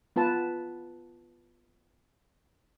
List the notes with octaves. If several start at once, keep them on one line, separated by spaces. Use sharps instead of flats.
B3 F4 B4 A5